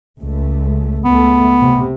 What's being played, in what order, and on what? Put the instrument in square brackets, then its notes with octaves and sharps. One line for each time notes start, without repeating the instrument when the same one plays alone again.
[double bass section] C#2 A3
[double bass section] C#2 A3 [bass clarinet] B3
[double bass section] C3